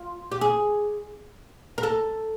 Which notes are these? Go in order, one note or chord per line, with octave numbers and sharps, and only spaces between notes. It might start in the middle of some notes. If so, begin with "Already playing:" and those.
Already playing: F4
G4
G#4
A#4
A4